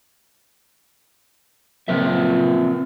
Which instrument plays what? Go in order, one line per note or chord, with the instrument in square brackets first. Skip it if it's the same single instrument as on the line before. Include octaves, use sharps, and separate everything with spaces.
[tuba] A#2 [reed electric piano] C#3 F3 F#3 [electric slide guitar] C4 B4 E5